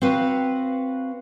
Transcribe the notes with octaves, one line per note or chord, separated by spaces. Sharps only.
C4 F#4 B4 F5